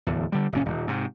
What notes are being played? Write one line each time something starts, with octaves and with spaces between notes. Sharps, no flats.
D1 E2
D3 G3
F#1 A#2 C#4
D#1
G#2 C3